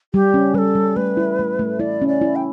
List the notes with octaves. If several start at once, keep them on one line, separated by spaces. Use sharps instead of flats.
G3 G4
C#4
G3 A4 B4
G3
A3 B4
E4
A3
A3
E4 D5
C#4
D5
E4
G5